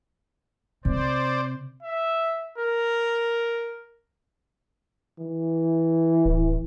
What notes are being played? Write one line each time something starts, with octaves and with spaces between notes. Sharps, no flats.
C3 C5 D5
E5
A#4
E3
D1